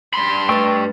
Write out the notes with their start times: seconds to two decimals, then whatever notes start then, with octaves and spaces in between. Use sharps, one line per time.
0.14 G2 B5 C6
0.49 A3 B4 G5 C#6 E6 A6